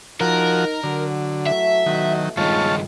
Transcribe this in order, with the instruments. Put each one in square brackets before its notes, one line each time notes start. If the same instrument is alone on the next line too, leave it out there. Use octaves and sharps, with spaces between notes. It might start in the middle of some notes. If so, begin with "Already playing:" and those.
[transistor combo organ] F3 F#4 [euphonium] D#4 [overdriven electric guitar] A#4
[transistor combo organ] D3 [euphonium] F#3
[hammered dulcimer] E3 A3 A4 [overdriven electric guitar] E5
[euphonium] B2 [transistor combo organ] D#3 F#3
[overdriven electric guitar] G2 D#3 [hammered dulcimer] A#2 G5 [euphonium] G#3 [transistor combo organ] F4 C#5 A5